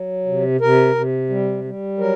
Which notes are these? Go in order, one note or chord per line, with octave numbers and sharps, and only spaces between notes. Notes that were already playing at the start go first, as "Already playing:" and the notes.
Already playing: F#3
C3
C3 A#4
C3
G3
G3
F#3 A#4